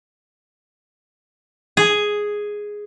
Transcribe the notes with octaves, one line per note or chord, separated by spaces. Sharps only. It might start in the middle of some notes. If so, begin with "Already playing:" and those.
G#4